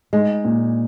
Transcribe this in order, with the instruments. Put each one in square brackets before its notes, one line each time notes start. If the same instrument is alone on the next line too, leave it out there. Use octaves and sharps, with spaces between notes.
[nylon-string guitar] G#3 [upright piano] D#4
[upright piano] A#2